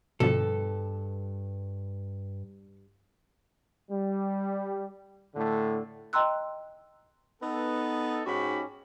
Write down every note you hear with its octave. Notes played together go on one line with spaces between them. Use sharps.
G2 B2 D3 F3 A4
G3
A2 D3
D#5 G5 A#5 C6 E6 F#6
B3 D#4 A4
G#2 C#4 D#4 F#4 G4 B5